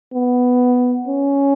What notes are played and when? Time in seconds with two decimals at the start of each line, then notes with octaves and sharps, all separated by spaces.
0.14 B3
1.07 C#4